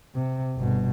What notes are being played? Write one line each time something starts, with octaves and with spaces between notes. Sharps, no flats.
C3
G1 B2